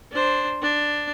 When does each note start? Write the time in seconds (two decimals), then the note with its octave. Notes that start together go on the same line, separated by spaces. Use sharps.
0.12 D4 C5
0.62 D4